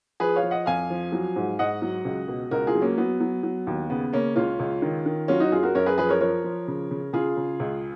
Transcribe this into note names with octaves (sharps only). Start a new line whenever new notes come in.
F3 G#4 B4
C#5 F5
F3
D#5 F#5
F2 F5 G#5
F3
F#3
G#2
G#2 D#5 F#5
F#3
C#2
B2
C#2 F#4 A#4
F4 G#4
F#3
A#3 C#4
F#3 B3
F#3
F#3
D#2
C#3 B3
C#3 A#3 C#4
C#2 C#4 F4
C#2
D#3
D#3
F#3 C#4 F4
D#4 F#4
F#2 F4 G#4
F#4 A#4
F#2 A#4 C#5
G#4 B4
F3 G#4 B4
A#4 C#5
F3 A#4 C#5
F3
C#3
C#3
C#3 F4 G#4
C#3
C#2